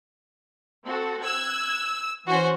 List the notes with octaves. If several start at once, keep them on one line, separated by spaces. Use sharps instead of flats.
C4 F#4 A4
E6 F#6 G#6
E3 C#4 F#4 C5